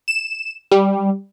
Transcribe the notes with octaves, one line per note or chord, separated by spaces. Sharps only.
E7
G3